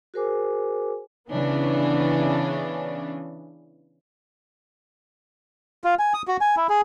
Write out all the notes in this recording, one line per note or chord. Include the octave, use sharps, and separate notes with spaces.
F#4 G#4 A#4 C5 G#5 D6
C#3 E3 B3 C#4 D4
F4
G#5
D#6
F#4
G#5
E4
G#4